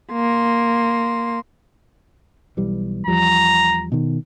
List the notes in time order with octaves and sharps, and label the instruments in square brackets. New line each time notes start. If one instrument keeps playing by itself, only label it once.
[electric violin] A#3 C6
[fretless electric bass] B1 E3 G3
[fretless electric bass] E2 F3 G3 [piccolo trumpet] A#5
[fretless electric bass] B2 D#3